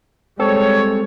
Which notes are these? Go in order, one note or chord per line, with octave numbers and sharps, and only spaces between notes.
G3 G#3 C4 A4 C#5